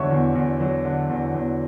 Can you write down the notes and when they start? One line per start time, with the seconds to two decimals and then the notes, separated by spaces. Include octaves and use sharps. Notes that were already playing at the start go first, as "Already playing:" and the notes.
Already playing: E2 D3 F#3 C#5 E5 C#6
0.10 E2
0.35 E2
0.60 F#3
0.85 D3
1.10 E2
1.34 E2